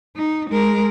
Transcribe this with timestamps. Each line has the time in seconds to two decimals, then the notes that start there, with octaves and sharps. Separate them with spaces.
0.16 D#4
0.50 G#3 A#4